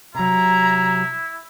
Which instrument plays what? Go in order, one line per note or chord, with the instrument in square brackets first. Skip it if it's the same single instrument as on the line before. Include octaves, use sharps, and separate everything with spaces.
[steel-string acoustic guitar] C3 F#3 [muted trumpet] E4 [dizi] A#5